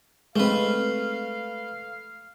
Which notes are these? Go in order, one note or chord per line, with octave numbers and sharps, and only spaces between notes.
G#3 A3 C4 B4 F5